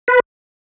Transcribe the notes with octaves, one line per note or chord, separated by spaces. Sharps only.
B4